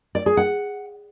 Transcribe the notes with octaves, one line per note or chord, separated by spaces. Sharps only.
D5
G#4
F#5